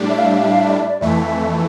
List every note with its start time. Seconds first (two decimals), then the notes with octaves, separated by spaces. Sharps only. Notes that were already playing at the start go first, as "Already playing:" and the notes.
Already playing: A2 G3 D4
0.10 E5
0.18 F5
0.26 E5
0.35 F5
0.42 E5
0.51 F5
0.60 E5
0.70 D5
0.79 E5
0.89 D5
1.01 F2 E3 A3 E5